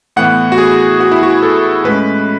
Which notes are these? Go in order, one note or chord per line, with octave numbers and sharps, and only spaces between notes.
A2 E3 B3 F#5
F#4
G#4
F#4
E4
F#4
A4
A2 G#3 C#4 B4